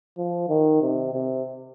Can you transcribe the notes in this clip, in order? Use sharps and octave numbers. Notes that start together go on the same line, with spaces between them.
F3
D#3
C3
C3